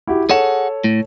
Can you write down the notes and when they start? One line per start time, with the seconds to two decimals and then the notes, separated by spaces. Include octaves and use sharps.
0.07 E4 F#4 G4
0.30 G#4 A4 C#5 F#5 E7
0.84 A2